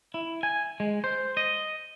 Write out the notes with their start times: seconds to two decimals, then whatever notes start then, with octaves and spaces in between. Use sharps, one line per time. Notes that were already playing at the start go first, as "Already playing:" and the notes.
0.14 E4
0.43 G#5
0.80 G#3
1.04 C5
1.37 D#5